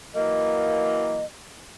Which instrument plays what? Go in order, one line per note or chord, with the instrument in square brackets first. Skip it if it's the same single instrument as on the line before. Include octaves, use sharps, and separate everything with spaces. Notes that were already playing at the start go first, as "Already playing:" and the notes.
[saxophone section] E3 F#3 A#3 [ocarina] D#5